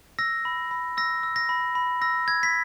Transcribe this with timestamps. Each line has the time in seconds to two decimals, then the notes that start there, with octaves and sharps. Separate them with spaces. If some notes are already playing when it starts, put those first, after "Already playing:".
0.19 E6 A#6
0.45 B5
0.71 B5
0.97 E6 A#6
1.23 E6
1.36 A#6
1.49 B5
1.75 B5
2.02 E6 A#6
2.28 E6 G#6
2.43 B6